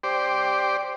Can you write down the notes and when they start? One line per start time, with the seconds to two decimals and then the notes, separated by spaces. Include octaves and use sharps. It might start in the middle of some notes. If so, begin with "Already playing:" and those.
0.03 G4 C5 D5